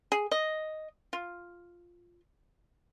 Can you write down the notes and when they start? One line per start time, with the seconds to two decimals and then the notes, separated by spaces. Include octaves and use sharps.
0.12 G#4
0.31 D#5
1.13 F4